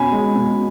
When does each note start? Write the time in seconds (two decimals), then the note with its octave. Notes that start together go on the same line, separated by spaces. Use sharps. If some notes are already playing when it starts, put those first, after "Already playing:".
Already playing: B2 C#4 G#5 B5
0.12 G#3
0.35 B2